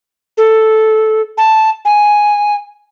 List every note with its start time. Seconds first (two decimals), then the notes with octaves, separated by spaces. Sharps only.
0.37 A4
1.38 A5
1.85 G#5